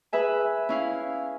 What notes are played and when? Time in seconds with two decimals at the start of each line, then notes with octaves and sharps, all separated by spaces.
0.13 G#4 B4 E5 G#5
0.69 C#4 E4 F5